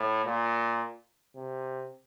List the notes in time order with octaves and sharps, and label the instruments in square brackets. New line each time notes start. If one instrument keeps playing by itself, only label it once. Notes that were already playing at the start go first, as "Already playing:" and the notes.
Already playing: [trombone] A2
A#2
C3